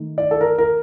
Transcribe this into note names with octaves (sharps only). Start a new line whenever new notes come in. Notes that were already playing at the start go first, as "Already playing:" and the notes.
Already playing: D#3 A3 D#4
D5
A4
A#4
A#4